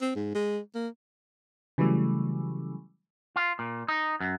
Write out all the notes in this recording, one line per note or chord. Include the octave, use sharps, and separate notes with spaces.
C4
G#2
G#3
A#3
C#3 E3 F#3 G3 A3
F4
A#2
D#4
F#2